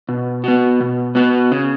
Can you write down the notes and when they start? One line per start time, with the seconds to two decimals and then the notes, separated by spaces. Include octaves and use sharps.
0.09 B2
0.44 B3 F#4
0.81 B2
1.15 B3 F#4
1.52 C#3